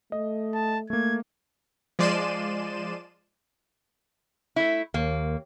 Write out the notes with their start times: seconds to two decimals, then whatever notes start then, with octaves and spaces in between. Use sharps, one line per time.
0.12 A3 D#5
0.54 A5
0.90 A3 A#3 G#6
1.99 F3 G#3 D5 C6 D#7 E7
4.56 A3 E4
4.94 D#2 A#3